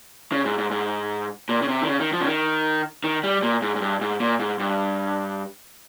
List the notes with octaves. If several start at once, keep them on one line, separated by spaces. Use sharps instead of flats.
C#3
G#2
G#2
G#2
A#2
C#3
C3
D#3
C#3
D#3
F3
C#3
D#3
D#3
G3
A#2
G#2
G#2
G2
G#2
A#2
G#2
G2